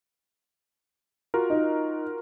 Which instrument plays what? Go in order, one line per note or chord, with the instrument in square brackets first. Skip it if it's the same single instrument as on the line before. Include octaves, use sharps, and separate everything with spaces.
[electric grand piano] F4 F#4 A#4
[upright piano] D#4